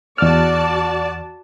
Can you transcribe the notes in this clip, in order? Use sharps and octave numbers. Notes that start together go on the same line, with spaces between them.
E2 F#4 D5 A5 F6